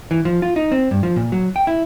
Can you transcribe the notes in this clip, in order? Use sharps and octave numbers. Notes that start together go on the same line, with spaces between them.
E3
F3
F4
D#4
C4
G2
F3
A#2
F#3
G5
E4